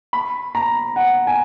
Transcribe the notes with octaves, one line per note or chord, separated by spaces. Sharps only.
B5
A#5
F#5
G#5